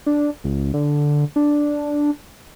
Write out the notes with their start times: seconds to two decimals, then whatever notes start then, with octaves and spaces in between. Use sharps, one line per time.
0.06 D4
0.44 C#2
0.74 D3
1.36 D4